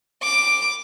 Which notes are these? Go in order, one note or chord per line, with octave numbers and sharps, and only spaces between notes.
D6